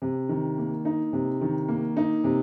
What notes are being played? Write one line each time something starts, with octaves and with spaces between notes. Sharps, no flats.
C3
D#3
A#3
D#4
C3
D#3
A#3
D#4
C3